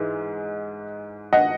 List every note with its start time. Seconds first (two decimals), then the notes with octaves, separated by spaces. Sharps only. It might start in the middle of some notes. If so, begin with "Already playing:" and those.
Already playing: G#2 E3 G#3 D#4
1.33 D#5 F#5